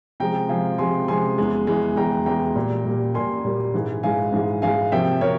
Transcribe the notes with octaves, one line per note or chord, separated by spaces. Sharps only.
C3 F3 G#3 G5 A#5
C3 F3 G#3 F5 G#5
C3 F3 G#3 G#5 C6
C3 F3 G#3 G#5 C6
E2 E3 G#3
E2 E3 G#3
E2 E3 G#3 G5 A#5
E2 E3 G#3 G5 A#5
A#2 G3 A#3
A#2 G3 A#3
A#2 G3 A#3 G#5 C6
A#2 G3 A#3
G#2 E3 G#3
G#2 E3 G#3 F5 G#5
G#2 E3 G#3
G#2 E3 G#3 F5 G#5
C3 F3 A#3 E5 G5
C3 A#4 C#5